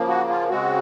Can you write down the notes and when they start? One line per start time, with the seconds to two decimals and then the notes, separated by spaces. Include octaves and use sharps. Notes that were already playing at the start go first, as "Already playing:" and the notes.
Already playing: C#3 F3 A#3
0.08 F#4
0.30 F4
0.49 C#3 G#3 C4 F#4